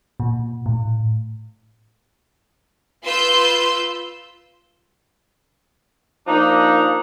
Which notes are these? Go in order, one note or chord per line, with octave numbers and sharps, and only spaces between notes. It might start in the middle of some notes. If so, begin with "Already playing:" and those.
A#2
A2
F4 B4 C6 E6 G6
F3 A#3 D4 D#4